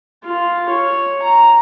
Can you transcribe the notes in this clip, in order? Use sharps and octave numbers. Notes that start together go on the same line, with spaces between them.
F4
C#5
A#5